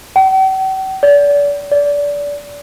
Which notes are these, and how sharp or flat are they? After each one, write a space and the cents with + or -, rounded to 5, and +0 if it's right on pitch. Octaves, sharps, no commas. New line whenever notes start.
G5 -45
D5 -35
D5 -25